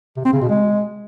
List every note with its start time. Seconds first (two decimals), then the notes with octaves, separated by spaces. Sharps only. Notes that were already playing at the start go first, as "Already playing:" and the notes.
0.17 C3
0.25 C4
0.33 C#3
0.41 B2
0.50 G#3